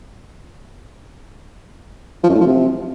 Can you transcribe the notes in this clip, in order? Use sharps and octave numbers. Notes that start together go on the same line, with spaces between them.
F3
F#2
A2
F3
C3